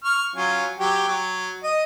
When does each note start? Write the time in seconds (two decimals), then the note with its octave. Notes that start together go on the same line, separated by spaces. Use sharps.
0.04 C#6 F6
0.36 F#3 C#4 F4
0.79 F#3 G4 G5
1.08 F#3
1.64 D#5